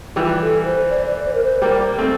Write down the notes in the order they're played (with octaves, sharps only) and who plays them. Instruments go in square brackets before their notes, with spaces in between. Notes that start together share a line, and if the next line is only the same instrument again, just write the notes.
[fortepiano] E3 G3 [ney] F4
[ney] A4
C5
D5
D5
C5
A#4
C5
[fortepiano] G3 A#3 [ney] A#4
[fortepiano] A3 C4